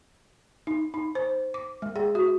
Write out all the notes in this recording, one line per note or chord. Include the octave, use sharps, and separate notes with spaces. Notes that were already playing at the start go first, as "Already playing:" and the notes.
D#4
D#4
C5
D6
G#3
G#4
F#4